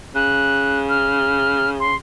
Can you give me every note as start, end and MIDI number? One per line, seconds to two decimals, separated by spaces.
0.15 1.96 49
0.15 0.79 90
0.89 1.70 89
1.80 1.96 84